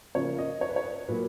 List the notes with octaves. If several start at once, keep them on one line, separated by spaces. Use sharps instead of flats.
C#3 F3 A#3 C#5
D#5
C#5
B4
C#5
A#2 F#3 A#3 B4